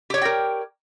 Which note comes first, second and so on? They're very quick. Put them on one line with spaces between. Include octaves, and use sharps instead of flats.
G4 C#5 D5 G5 A#4